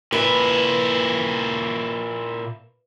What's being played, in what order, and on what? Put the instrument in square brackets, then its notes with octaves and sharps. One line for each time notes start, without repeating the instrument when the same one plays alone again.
[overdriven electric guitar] A#2 E4 [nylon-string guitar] B4